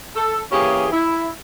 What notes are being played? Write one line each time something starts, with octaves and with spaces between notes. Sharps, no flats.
A4
E3 A#3 C#4 G4 G#4
E4